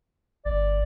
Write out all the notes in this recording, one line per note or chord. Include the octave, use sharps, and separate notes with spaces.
G1 D5